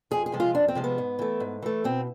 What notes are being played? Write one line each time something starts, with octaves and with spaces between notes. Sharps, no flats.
F2 G#4
G#4
C3 F3 G#3
F4
F2 D4
C4
C3 F3 G#3
B3
G#2
E3 A3
G#2
E3 A3
B2 C4